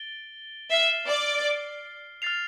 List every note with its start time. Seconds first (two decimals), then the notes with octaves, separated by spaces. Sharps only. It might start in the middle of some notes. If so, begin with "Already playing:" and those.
Already playing: A6 D7 G7
0.70 E5 F6 C7 G7
1.08 D5
2.22 F6 A6 C7 F7